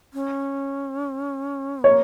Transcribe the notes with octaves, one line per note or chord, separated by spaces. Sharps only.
C#4
A#3 C#5